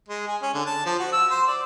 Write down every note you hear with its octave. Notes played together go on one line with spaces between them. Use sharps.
G#3
G#4
C#4
D3
A5
F3
F#4
E6
C5
D5